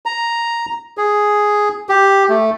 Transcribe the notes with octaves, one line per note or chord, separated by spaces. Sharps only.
A#5
G#4
G4
A3